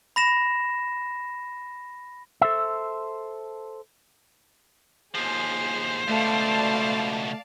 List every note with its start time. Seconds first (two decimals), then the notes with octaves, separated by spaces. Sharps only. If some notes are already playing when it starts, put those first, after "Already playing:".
0.16 B5 A#6 E7
2.41 A4 C5 E5
5.15 D#2 F3 G#4 C5
6.08 C#2 B2 A3 D5 F5 A5